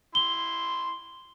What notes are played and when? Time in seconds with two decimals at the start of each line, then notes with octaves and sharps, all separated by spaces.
0.15 E4 C6 G7